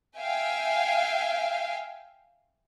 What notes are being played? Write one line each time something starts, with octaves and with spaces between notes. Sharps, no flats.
E5 F5 G5 G#5